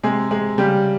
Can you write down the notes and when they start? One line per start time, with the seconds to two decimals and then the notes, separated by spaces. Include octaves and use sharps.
0.03 C3 G#3 G#4
0.31 C3 G#3 G#4
0.58 C#3 G3 G4